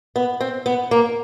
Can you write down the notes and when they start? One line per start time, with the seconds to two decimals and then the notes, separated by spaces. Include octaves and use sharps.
0.16 B3
0.41 C4
0.66 B3
0.91 A#3